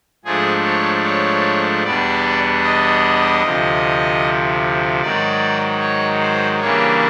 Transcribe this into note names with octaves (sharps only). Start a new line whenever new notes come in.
G#2 F3 A3 D4 G#4
C#5
C#5
E2 B2 G3 B3 D4 D5
D#5
D2 C3 F3
G#2 D#3 F#3 D5
C#5
C5
C#3 E3 G3 A#3 D4 C#5